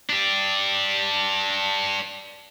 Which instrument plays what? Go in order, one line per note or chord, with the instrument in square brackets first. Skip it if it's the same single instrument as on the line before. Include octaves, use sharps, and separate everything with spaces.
[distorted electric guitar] D4 G4